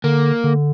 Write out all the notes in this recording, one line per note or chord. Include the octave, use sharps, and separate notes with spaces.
D3 A#3
D3